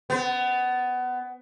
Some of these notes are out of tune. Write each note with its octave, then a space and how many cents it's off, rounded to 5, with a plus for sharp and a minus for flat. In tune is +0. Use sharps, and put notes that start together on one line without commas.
B3 +20